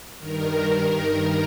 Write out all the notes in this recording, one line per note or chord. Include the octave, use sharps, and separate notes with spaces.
G2 D#3 A#4
A#4